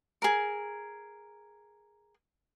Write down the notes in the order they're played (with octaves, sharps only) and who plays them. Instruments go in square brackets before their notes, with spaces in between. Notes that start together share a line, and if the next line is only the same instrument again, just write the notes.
[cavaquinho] G#4 A#4